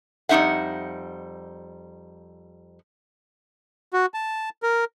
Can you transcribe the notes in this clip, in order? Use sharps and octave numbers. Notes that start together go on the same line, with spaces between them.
F2 G3 A3 D#4 E5 F#5
F#4
A5
A#4